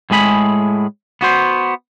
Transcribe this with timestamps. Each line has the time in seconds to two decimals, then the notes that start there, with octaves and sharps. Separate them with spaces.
0.10 A2 G#3 G#4 B5
1.21 B3 F#4 C5